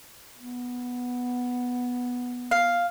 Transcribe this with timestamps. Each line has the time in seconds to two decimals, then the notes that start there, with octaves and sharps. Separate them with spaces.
0.38 B3
2.51 F5